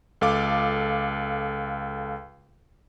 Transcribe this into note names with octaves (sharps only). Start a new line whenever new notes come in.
C#2 A4 F5 D6